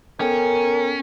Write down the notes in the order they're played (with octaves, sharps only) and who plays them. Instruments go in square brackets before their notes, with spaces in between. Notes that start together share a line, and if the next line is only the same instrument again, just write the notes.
[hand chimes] B3 A4 G5 [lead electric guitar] C#4 [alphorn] A#4